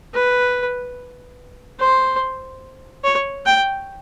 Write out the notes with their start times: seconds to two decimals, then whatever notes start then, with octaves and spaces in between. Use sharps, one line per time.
0.14 B4
1.80 C5
3.04 C#5
3.46 G5